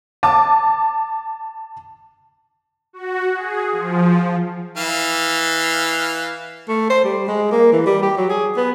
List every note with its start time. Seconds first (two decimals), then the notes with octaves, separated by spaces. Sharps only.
0.23 A5 D6
2.93 F#4
3.34 G#4
3.72 F3
4.77 E3 F5
6.68 A3
6.90 C5
7.04 G3
7.28 G#3
7.52 A#3
7.73 E3
7.86 G3
8.02 G4
8.17 F#3
8.29 G#4
8.57 B3